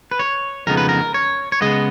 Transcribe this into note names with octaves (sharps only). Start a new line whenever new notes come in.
B4
C#5
F2 C#3 G#3 B3 D#4 A#4
B4
A#4
C#5
C#5
C#3 G#3 B3 D#5